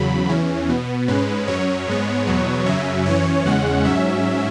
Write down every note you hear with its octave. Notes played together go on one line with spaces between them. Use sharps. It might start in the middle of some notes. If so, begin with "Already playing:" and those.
Already playing: E2 C#3 F#3 B5
E2 E3 C#4
B2 B3
G#2 G#3 C#4 B4
F#2 F#3 C#4 C#5
G#2 G#3 B3
E2 B2 F#3 B3
F#2 C#3 F#3 C#4 E5
F#2 E3 C#4 C#5
E2 C#3 G#3 C#4 F#5
G#2 F#3 C#4 E5